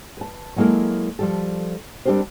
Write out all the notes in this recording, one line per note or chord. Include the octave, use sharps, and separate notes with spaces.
B4 A5
F#3 G#3 A#3 E4 A4 A#4
F3 G3 A4
G3 C4 D4 G4 A#4 C5